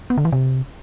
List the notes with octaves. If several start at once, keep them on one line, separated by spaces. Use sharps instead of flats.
B3
D3
E3
C3